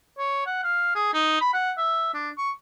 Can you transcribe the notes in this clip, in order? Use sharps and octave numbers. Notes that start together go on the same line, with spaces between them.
C#5
F#5
F5
G#4
D#4
B5
F#5
E5
D4
C#6